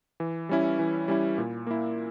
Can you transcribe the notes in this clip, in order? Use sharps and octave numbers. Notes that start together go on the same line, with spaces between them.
E3
G3 C#4 E4
E3
G3 C#4 E4
A#2
A#3 E4